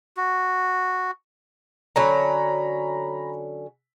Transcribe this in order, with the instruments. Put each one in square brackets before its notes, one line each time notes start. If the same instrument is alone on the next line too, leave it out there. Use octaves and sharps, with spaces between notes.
[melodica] F#4
[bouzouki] D3 F#3 C#4 [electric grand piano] A#5 B5